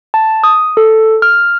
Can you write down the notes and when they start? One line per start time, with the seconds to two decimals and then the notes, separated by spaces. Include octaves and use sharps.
0.14 A5
0.44 D#6
0.77 A4
1.22 F6